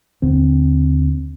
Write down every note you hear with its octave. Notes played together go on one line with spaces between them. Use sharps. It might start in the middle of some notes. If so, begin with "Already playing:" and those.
D#2 D3 C4